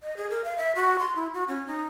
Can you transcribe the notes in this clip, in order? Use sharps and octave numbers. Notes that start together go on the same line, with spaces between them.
D#5
G#4
A#4
F5
E5
F#4
C6
E4
F#4
C#4
D#4